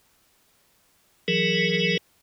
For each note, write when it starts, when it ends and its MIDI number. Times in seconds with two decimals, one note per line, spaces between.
1.28 1.97 52
1.28 1.97 54
1.28 1.97 68
1.28 1.97 70